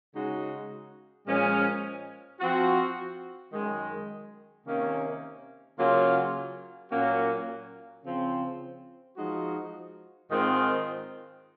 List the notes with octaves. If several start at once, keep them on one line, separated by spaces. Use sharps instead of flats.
C#3 G#3 D#4 F#4
A#2 F3 G#3 C#4
F3 C4 F#4
F#2 D#3 G#3
C3 D#3 A#3 C#4
C#3 F#3 A#3 C#4 F4
A#2 F#3 A#3 C#4 F#4
C#3 F3 C4
F3 G#3 D#4 F#4
G#2 D#3 G#3 C4 F4